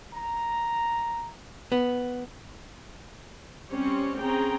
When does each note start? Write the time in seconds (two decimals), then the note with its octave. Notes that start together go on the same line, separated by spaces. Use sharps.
0.14 A#5
1.72 B3
3.71 G3 C4 C#4 C5 C#5
4.19 C4 C#4 G#4 G5 A#5